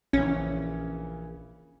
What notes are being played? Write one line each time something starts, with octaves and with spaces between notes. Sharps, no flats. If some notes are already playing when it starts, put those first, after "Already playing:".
A#1 C#3 E3 C#4